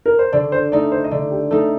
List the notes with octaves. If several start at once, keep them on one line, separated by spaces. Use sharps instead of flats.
A#4
C5
D3 D5
C5
A3 D#4 D5
C5
D#5
D3 D5
G4
A3 D#4 A4